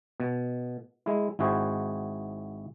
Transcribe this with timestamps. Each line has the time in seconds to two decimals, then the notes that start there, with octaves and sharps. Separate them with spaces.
0.20 B2
1.06 G#3 E4
1.39 G#1 E4 F#4 G#4 C5